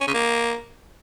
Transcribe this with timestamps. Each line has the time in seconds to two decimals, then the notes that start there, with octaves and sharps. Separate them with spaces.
0.01 C#4
0.07 C#3
0.14 A#3